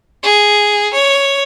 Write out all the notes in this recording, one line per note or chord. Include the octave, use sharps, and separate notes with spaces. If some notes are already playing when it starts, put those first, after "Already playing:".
G#4
C#5